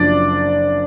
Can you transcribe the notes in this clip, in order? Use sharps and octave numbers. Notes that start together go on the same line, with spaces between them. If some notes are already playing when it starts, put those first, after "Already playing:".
Already playing: F#1 F#2 F3 D4 D5